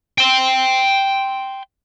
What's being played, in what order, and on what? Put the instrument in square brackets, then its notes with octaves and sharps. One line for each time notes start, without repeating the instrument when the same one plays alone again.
[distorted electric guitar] G5 C6